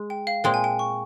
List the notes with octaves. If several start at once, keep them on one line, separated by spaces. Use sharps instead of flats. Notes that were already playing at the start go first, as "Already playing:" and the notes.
Already playing: G#3
G5
F5
A#2 G#3 C4 G5
G#5
G5
C#6